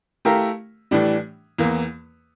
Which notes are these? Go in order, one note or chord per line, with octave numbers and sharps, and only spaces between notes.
A3 E4 G4 A#4 F5
A2 E3 G3 D4
E2 E3 A#3